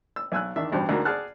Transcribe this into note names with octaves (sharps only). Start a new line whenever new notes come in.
E6
B1 G#5 E6 F#6
E2 D#3 D4 E5
A1 G2 B2 G4 C5
D2 G#2 A#3 F#4 A#5
G#4 D5 F#5 A5 F6 F#6